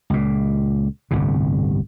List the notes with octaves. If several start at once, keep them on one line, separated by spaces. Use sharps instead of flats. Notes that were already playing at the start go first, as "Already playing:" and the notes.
C#2 A#2
G1 C2 A2 C3